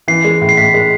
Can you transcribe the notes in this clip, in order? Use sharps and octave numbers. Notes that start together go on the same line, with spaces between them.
E3 C7
G#3
A2
C7
A2 B6
G#3